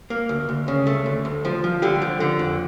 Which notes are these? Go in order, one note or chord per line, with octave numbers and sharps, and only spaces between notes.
A#3
D2
D2
C#3
A3
D2
D2
F3
F3
D3 G4
F3
D3
F2